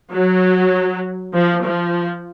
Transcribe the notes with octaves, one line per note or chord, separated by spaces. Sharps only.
F#3
F3
F3